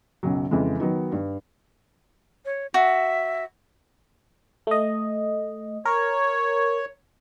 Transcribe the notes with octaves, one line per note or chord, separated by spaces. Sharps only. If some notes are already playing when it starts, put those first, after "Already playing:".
B1 F#2 C#3 F#3
F2 C#3 E3 G#3
D#3 F#3 B3 D#4
G2
C#5
F#4 E5
A3 D#5
A#4 C#5